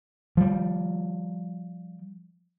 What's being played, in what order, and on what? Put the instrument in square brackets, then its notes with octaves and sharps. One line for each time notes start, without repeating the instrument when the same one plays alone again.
[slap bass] F3 G3